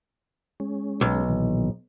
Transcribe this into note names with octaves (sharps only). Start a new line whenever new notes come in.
G#3 C#4
B1
A#2 D#3 E3